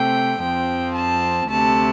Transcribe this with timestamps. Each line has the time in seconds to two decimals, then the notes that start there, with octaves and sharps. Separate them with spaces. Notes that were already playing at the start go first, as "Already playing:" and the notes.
Already playing: C3 A3 C4 G5
0.42 F2 F3 C4 G5
0.95 A5
1.48 D2 C3 A3 A5